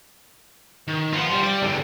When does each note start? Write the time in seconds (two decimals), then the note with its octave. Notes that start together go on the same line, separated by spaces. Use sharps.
0.88 D#3
1.13 B3 F4 C5 F#5
1.31 G3
1.43 D5
1.62 E2 D3